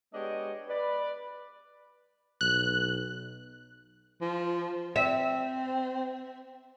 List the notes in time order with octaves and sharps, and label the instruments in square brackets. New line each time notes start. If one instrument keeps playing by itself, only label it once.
[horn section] G#3 B3 D4 G4 C#5 D#5
B4 D5
[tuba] B1 [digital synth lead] F#6
[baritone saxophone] F3
[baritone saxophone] C4 [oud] E5